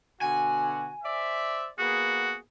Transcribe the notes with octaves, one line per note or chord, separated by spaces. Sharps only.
B2 D3 F#4 G#5
C5 D5 E5
A#3 B3 F#4 G#4